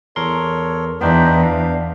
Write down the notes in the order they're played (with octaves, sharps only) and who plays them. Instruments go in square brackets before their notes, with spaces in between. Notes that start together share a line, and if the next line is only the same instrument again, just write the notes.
[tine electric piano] E2 A#4 C6 [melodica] A4 C#5
[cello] E2 [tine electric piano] B3 D4 [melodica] D#4 C5 G5
[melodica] F5